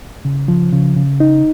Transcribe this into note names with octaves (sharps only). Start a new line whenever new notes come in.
C#3
F3
C#3
C#3
D#4